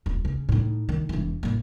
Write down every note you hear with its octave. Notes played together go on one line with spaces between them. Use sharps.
D#1
C#3
A2 D#4
D#3
E1 E3
A2 A#3